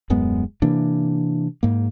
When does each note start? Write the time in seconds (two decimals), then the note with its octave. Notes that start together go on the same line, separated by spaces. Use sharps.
0.10 D#1 F#2 G#3 B3
0.62 C3 E3 A#3 D4
1.63 G#2 A#3